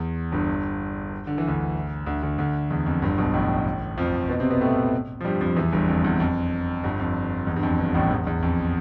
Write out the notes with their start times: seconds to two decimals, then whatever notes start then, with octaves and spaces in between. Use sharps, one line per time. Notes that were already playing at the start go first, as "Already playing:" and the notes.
Already playing: E2
0.32 G1 G2
1.27 D3
1.38 E3
1.48 D2 D3
2.06 D2 D3
2.23 D2 D3
2.38 D2 D3
2.71 E2
2.86 F2
3.02 G1 G2
3.18 B1 B2
3.34 A1 A2
3.98 F2 F3
4.29 B2 B3
4.40 C3 C4
4.50 B2 B3
4.61 A2 A3
5.21 F3
5.24 G2 G3
5.41 F2 F3
5.56 E2 E3
5.72 G1 G2
5.88 F2
6.04 E2
6.20 F2
6.84 G1 G2
7.00 F2
7.47 E2
7.56 G2
7.63 F2
7.79 G1 G2
7.94 A1 A2
8.11 E2
8.27 E2
8.43 F2